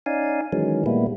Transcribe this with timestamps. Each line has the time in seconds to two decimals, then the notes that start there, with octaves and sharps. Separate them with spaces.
0.06 C#4 D#4 D5 F5 G#5
0.53 D#3 E3 F#3 G#3 C#4
0.86 A#2 G3 G#3 A#3 B3 E4